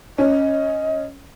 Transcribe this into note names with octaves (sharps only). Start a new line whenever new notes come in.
C#4 D#5